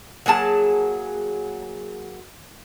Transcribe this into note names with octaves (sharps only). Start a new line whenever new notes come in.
F#3 A#3 G#4 A5